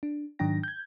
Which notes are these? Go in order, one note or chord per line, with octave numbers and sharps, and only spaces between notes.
D4
G#2 D#3 F#3 D4 G5 A#6
G6 G#6